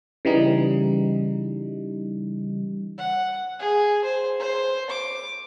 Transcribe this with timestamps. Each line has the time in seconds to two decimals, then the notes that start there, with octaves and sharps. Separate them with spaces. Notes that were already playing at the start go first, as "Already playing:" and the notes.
0.25 C#3 E3 G3 D#4
2.98 F#5
3.59 G#4
4.04 C5
4.40 C5
4.90 D6